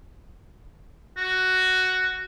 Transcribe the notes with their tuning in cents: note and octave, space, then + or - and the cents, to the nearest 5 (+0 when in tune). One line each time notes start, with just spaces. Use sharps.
F#4 +5